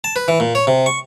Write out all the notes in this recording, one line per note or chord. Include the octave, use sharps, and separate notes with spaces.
A5
B4
E3
A#2
C#5
C3
C#6